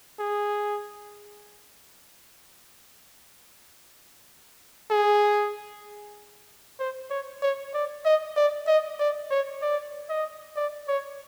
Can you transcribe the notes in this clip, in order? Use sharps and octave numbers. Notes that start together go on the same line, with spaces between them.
G#4
G#4
C5
C#5
C#5
D5
D#5
D5
D#5
D5
C#5
D5
D#5
D5
C#5